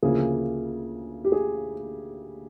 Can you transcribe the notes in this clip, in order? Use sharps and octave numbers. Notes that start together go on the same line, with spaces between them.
D2 C#3 F3 A#3 G#4
G4
G#4